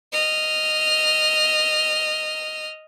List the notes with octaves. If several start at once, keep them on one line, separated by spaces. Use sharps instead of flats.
D#5 F6